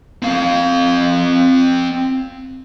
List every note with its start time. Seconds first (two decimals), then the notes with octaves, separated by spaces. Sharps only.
0.22 C4 F5